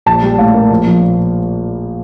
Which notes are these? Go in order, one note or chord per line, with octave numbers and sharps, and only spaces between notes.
A#1 A5
G3
A2 F5
A#3
A#1
F3
A#2